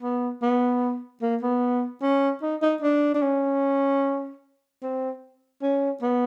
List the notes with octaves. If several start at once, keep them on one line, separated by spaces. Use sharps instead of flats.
B3
B3
A#3
B3
C#4
D#4
D#4
D4
D4
C#4
C4
C#4
B3